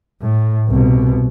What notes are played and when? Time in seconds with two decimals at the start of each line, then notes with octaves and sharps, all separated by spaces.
0.22 A2
0.69 C2 B2